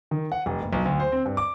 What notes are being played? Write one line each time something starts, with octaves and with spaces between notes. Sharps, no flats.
D#3
F#5
F1
F#1
B1
D2
C5
C4
G2
D6